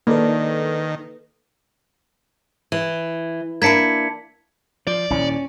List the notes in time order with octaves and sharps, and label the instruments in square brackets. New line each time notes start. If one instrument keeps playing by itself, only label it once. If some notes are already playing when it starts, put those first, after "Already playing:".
[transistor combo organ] D#3 [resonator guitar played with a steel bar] G#3 D4 [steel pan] A#3 [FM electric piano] D#4 A4 B4
[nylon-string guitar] E3
[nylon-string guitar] A#3 D4 E4 [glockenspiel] G#6 B6 C#7
[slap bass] F3 [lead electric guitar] D5
[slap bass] D#1 [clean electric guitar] C#4 [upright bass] E4